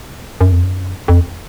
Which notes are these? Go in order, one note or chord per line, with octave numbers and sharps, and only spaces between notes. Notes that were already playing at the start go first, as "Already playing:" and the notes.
F#2
F2
F#2
F2